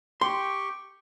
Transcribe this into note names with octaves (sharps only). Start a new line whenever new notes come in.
G4 G5 C6 C#6